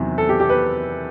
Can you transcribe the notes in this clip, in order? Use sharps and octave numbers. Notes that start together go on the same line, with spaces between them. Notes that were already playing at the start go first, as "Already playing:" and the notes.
Already playing: E2 C3 D#3 F#3
A4
G4
G4
B4